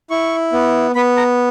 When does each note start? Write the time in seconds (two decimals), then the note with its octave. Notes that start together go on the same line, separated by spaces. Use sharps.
0.10 E4 C#6
0.52 B3
0.95 B3 B5
1.17 A#5